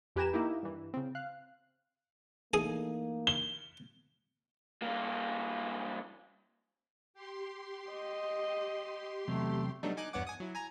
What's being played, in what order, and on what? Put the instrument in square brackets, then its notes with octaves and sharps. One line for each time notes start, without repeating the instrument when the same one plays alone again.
[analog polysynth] F2 G4 B4 G#5 A#5 E7
A#3 D#4 E4 G4
G2 E3
C#3 C4
F5 F#6
[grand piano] E3 A3 D#4 [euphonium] A#3 [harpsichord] G#4 G#5
[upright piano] G7
[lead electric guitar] G2 A#3
[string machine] G4 C6
[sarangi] D#5
[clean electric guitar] E2 C3 F#3 [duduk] A3
[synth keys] F#3 G3 A3 B3 D4 D#4
D#4 G#5 D6 F#6
E2 G2 B3 C#5 F#5 D6
G#5 D#6
F#3 E4
G#5 A#5